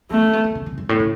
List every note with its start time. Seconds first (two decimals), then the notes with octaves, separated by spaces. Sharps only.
0.11 A3 B3
0.22 C#4
0.33 B3
0.44 B3
0.55 C#3
0.66 C#3
0.78 F#2
0.89 A2
1.00 C#3